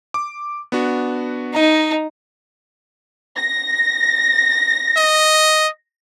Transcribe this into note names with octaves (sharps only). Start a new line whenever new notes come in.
D6
B3 D4 F#4
D#4 D#5 A#5
A#6
D#5